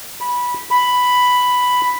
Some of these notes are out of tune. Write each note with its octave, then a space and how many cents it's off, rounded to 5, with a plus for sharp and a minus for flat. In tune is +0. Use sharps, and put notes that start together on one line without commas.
B5 -15
B5 +5